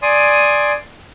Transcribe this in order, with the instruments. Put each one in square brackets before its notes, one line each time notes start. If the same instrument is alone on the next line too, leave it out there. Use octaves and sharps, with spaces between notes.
[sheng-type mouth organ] D5 G#5 C6 D#6